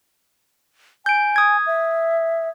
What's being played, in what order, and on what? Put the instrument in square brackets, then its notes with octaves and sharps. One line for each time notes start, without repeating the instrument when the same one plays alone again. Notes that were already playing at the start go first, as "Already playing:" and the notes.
[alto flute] G#5 [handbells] G6 D7
[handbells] D#6 G#6
[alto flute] E5